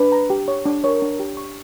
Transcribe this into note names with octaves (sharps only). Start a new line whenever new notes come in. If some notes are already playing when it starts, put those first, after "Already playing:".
Already playing: D4 B4
A#5
G4
C#5
D4
A#4 C#5
D4
G4
C#6